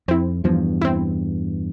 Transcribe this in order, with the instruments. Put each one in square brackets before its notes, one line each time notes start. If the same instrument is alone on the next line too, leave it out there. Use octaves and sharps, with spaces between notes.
[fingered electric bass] F2 [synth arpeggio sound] C4 E4
[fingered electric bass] E2 G2 [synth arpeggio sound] F3
[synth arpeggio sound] C4 E4